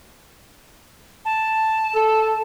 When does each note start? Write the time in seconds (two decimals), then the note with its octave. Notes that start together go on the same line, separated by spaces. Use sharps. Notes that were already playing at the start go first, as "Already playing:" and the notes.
1.25 A5
1.95 A4